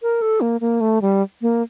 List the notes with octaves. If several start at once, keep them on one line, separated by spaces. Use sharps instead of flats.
A#4
A4
A#3
A#3
A3
G3
A#3